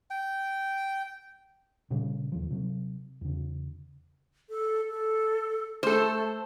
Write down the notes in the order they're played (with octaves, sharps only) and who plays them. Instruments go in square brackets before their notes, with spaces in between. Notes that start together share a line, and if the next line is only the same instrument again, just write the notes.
[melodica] G5
[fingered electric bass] A#2 C#3 G3
D#2 F3
C3 F#3
E2 C#3
[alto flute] A4
A4
[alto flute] A3 [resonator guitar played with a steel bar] A4 C5